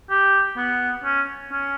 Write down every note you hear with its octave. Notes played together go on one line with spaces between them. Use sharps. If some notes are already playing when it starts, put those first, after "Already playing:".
G4
B3
C#4
C#4